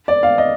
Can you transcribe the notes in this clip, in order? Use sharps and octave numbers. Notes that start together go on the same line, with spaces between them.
D5
F5
D#5